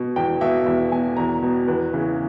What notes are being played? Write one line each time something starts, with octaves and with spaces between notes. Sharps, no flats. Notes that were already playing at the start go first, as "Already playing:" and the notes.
Already playing: B2
E2 G5
B2 E5
E2 E5
B2 G#5
E2 A#5
B2
E2 B4
C#3 E3